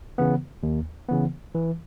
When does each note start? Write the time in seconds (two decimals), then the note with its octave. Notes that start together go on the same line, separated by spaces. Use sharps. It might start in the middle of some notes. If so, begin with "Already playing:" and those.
0.18 C#3 E3 B3
0.63 D#2
1.08 C#3 E3 B3
1.54 E3